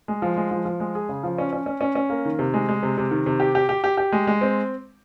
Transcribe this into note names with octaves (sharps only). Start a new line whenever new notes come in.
G#3
F3
G#3
F3
F3
G#3
G#4
C#3
F3
C#4
C#4
C#4
C#4
C#4
A#3
D#3
C3
G#3
G#3
C3
C3
D#3
C3
G4
G4
G4
G4
G4
G#3
G#3
C4